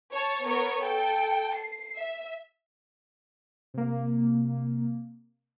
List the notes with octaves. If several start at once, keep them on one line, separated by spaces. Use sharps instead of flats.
C#5 A5
B3 A#4 C#5
A4 G5
C7
E5
C3 A#3